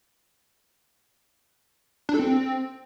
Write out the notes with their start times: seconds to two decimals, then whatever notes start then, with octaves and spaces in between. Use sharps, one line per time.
2.09 D4
2.14 A4
2.19 C4